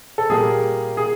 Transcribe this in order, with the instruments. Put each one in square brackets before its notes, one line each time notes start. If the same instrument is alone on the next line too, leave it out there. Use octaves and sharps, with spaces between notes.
[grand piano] A4
A#2 G3 A#3 G#4
G#4